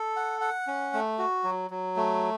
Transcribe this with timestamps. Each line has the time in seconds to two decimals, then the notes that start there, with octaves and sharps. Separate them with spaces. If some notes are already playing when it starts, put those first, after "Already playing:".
Already playing: A4
0.16 F#5
0.41 F#5
0.67 C#4
0.93 A3
1.19 F#4
1.44 F#3
1.70 F#3
1.96 A3